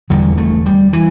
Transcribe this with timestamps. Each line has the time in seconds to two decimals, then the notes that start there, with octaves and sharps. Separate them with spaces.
0.10 E1 E2 D3 G3
0.37 A3
0.66 G3
0.93 E3